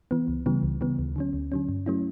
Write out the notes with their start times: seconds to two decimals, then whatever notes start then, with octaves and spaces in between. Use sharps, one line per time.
0.11 E3 B3
0.28 C#2
0.46 C#3 E3 G3 B3
0.63 C#2
0.81 C#3 E3 G3 B3
0.99 D2
1.16 D3 F#3 C#4
1.33 D2
1.52 D3 F#3 C#4
1.69 G2
1.86 F#3 A3 C#4 E4